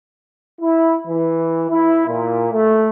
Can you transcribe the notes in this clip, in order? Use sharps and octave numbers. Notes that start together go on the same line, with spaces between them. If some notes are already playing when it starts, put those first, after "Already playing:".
E4
E3
E4
A#2
A3